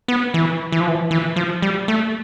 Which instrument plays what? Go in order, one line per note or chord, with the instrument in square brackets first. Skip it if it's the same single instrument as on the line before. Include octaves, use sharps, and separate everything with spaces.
[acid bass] B3
E3
E3
F3
E3
E3
F3
G3
A3